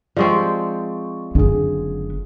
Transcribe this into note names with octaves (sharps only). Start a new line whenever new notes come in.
F3 G#3 C4 D5 C#6
F#1 D3 B3 G#4